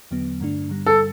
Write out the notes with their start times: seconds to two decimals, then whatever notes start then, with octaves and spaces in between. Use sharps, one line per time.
0.11 E2 D3 F#3 B3
0.40 G2 D3 A3 D4
0.69 G2 D3 G3
0.86 A4